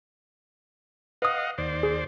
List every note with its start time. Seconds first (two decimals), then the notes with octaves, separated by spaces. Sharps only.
1.22 B4 D#5 F5 F#5 D#6
1.58 D#2 C5 D5
1.83 G#4